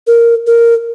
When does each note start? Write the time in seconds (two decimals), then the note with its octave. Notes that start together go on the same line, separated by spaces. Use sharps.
0.07 A#4
0.47 A#4